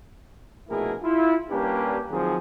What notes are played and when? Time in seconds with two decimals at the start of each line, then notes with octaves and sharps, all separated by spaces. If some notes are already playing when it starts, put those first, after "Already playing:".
0.68 A#1 B2 A3 E4 G#4 A#4
1.03 E4 F4
1.50 G3 A#3 C#4 D4 G4 B4
2.10 D#3 F3 F#3 C4 G#4